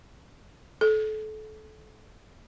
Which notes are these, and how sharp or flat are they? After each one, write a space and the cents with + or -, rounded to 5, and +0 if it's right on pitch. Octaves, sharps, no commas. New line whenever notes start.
A4 -30